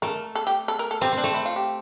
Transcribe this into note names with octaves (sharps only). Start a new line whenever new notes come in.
A3 A#4
A4
G4
A4
A#4
A4
C4 G4
C4
D4
A3
E4
F4
G4